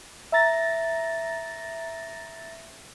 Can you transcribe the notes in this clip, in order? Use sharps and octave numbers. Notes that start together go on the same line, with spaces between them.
E5 A#5 A6 A#6